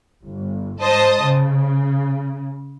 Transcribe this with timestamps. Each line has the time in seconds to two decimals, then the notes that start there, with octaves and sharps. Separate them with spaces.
0.24 G1
0.81 G#2 C5 D#5 A5 D#6
1.24 C#3